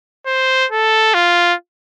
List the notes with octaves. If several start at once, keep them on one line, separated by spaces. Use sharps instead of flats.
C5
A4
F4